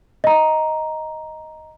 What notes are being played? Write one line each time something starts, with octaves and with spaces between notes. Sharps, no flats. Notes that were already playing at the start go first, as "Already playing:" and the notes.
D#5 A#5